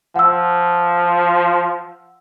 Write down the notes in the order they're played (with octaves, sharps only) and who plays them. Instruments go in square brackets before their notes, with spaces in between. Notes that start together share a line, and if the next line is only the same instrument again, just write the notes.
[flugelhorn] F3 [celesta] F#5 E6